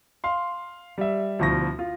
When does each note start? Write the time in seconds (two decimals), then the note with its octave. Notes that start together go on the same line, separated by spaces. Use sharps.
0.24 F5 C6
0.98 G3 E5
1.39 D2 B2 F3 E4 C#6 A#6
1.79 F4